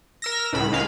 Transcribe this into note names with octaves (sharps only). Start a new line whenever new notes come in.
A#4 E6 A#6
C#2 A2 B5
C#2 G#3 F5